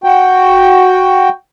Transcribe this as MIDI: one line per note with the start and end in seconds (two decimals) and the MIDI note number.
0.04 1.29 66
0.04 1.29 79